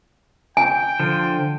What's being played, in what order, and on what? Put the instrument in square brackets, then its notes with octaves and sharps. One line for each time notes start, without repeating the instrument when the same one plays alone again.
[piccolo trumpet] G5 [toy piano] G#5
[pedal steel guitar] D3 F3